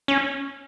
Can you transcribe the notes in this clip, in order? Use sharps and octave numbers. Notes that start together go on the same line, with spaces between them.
C#4